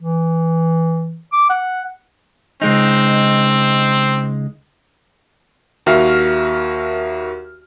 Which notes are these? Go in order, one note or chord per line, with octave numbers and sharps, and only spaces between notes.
E3
D6
F#5
C#2 G#3 C4 D#4
D#2 F#4 A#4 E5 F5 F6